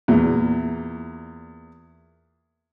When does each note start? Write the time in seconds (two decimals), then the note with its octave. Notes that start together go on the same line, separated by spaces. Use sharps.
0.08 E2 A#2